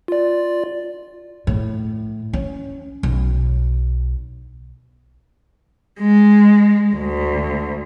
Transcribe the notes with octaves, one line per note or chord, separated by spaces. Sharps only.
F4 D5
A2
C#4
B1
G#3
D2